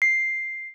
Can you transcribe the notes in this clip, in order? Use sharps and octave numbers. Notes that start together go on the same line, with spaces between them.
C7